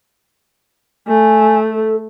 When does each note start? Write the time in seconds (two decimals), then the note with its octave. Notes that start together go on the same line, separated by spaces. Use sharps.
1.07 A3 G#5
1.71 A4